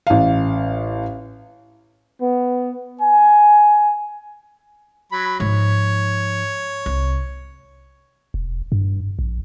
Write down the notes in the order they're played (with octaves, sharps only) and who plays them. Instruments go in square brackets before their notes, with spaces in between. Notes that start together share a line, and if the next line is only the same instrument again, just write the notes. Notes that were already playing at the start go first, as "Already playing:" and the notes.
[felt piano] A1 F5
[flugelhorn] B3
G#5
[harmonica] F#3 B5
[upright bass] G#2 F3 [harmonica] C#5
[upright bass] C2
[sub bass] E1
G2
A#1